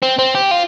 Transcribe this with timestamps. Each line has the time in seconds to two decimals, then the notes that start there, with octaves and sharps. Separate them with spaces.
0.02 C4
0.19 C4
0.35 G4
0.51 F4